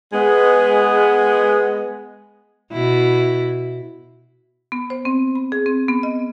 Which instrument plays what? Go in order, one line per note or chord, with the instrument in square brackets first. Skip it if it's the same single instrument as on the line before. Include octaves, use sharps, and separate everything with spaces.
[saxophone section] G#3 B3
[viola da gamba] B2 E4
[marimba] B3
C5
C4
B5
G#4
C4
B3
D#5